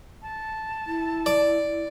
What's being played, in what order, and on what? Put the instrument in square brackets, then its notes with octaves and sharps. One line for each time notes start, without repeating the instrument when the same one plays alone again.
[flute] A5
[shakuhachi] E4
[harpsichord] D5